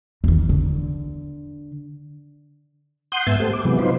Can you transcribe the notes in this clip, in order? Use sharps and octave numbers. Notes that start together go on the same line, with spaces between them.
E2 D#3
D3
F#5 C6 D#6 G6
G#2 B3 E5 G#5 A5
A3 G4 A4 C5
D6
C3 E3 F#3 G#3 B3
D#4 F4 B4 C5